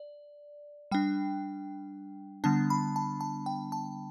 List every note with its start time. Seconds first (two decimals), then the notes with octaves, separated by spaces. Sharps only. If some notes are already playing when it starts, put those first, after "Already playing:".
Already playing: D5
0.91 G3 D4 G5
2.44 D3 G3 B3 D4 A5
2.70 B5
2.96 A5
3.21 A5
3.46 G5
3.72 A5